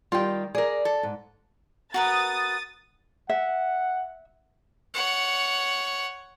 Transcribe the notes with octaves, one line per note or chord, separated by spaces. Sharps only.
D#3 G3 F4 G5
G#4 A#4 D5
A4
G#2
F#4 A#4 B4 D#6 A6
E5 F#5
C#5 F#5